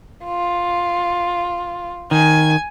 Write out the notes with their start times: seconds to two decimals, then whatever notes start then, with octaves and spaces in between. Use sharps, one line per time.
0.24 F4
2.11 D#3 G#5 G#6